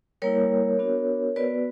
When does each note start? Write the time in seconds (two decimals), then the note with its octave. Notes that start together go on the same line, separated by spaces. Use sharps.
0.22 G3 A#3 E4 A#4 C#5
0.79 B3 D4 F#4
1.36 B3 F#4 B4 D5